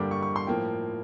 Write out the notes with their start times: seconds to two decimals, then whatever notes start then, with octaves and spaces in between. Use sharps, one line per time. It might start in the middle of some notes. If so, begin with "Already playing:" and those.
Already playing: G2 D3 G3 A#3 D6
0.11 C#6
0.22 C#6
0.36 C6
0.47 A2 F3 A#3 G5